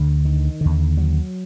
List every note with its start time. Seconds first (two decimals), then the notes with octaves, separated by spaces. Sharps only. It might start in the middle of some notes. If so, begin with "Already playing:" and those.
Already playing: D2 D3
0.25 D#3
0.61 D#2 D3
0.97 F#3